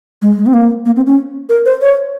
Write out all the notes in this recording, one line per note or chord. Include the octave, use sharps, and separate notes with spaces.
G#3
G#3
C4
A#3
A#3
C4
C#4
A#4
C5
C#5